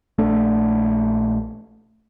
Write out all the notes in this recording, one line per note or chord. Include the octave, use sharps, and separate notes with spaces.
A#1 A3 D4